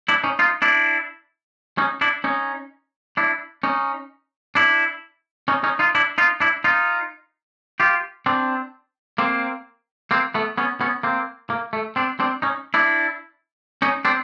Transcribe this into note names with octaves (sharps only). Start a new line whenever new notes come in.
D4 E4
C#4 D#4
D#4 F4
D4 E4
C#4 D#4
D4 E4
C#4 D#4
D4 E4
C#4 D#4
D4 E4
C#4 D#4
C#4 D#4
D#4 F4
D4 E4
D#4 F4
D4 E4
D#4 F4
F4 G4
C4 D4
A#3 C4
A#3 C4
A3 B3
B3 C#4
B3 C#4
A#3 C4
A#3
A3
C4 D4
C4 D4
C#4 D#4
D4 E4
C#4 D#4
C4 D4